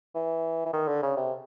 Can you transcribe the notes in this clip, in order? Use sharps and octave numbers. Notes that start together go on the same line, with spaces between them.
E3
E3
D#3
D3
C#3
C3